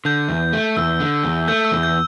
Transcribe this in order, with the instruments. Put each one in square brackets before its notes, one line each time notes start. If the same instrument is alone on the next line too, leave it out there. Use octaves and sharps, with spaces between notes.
[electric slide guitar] D3 [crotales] G6
[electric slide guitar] E2
A3
[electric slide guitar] E2 [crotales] E6
[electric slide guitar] D3
E2
[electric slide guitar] A3 [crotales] G6
[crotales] E6
[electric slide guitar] E2
[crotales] G6